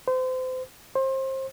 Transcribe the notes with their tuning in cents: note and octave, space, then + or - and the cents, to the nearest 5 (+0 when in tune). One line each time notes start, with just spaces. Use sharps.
C5 -30
C5 +30